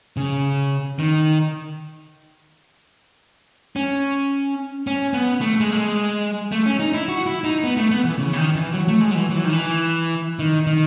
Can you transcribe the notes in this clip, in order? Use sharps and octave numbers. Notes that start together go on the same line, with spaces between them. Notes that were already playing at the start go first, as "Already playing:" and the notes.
C#3
D#3
C#4
C#4
B3
A3
G#3
A3
G#3
A3
C#4
D#4
E4
F#4
E4
D#4
B3
A3
B3
E3
C#3
E3
D#3
E3
F#3
A3
G#3
F#3
E3
F#3
E3
D#3
E3
D#3
D#3